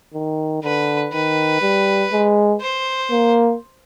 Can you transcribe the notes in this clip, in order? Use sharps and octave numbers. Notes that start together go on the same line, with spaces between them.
D#3
D3 B4
D#3 B4
G3
G#3
C5
A#3